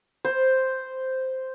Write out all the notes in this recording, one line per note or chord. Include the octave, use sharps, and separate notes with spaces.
C5